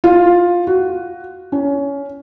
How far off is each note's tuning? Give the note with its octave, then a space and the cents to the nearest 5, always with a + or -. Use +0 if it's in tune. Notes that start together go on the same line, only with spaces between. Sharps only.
F4 +10
F#4 +10
C#4 +20